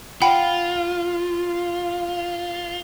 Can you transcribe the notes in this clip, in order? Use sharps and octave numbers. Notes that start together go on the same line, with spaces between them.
F4 F#5 G5 B5